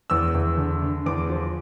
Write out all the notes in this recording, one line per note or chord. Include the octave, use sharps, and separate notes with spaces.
E2 E6
E2
D3
D3
E2 D6
F3